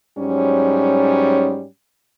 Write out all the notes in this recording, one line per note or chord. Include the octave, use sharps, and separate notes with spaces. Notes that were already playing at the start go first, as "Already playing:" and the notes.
G#2 F#3 G3 C#4